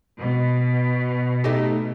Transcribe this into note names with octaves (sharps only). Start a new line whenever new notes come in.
B2
A3 D#4 G4